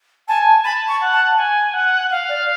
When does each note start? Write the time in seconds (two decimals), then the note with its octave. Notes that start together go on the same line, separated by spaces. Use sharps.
0.28 G#5 A5
0.60 G#5
0.64 A5 B5
0.88 C#6
1.01 F#5
1.13 A5
1.38 G#5
1.73 F#5
2.10 F5 F#5
2.29 D5